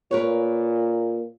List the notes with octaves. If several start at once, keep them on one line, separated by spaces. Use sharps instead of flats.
A#2 A#4 B4 C#5